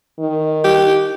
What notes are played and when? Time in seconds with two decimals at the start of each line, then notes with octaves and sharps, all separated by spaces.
0.19 D#3
0.64 G4